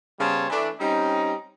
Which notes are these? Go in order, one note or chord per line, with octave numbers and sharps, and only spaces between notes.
C#3 G3 B3 C5 C#5 A5
E3 A3 D4
G3 C4 C#4 D#4